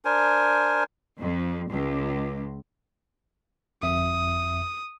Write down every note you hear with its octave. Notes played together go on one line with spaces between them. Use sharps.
D4 A#4 C5 G#5
F2
C#2
G1 F2 E5 D#6